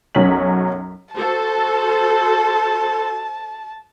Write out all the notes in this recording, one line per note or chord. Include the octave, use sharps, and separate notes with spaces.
B1 F#2 F#3 C#4 B6 F#7
F#4 A4 C5 A5